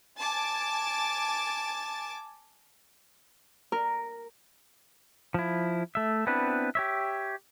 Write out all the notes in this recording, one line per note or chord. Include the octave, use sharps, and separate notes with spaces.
G#5 A5 D6 A6
A#4
F3 E4
A3 E5
B3 C4 D4 E4 B4
G4 C#5 E5